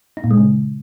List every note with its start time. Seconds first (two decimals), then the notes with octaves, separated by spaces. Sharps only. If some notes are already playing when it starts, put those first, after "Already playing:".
0.17 D#4
0.24 A#2
0.31 G#3
0.37 C#3